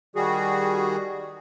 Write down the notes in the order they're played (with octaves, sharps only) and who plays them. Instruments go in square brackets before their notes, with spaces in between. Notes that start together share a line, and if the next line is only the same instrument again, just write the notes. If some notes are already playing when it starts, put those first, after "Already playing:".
[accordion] D#3 G3 F#4 G#4